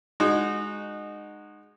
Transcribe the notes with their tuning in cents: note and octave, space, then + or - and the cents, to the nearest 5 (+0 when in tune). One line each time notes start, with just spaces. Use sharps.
G#3 +0 D#4 -25 F#4 -10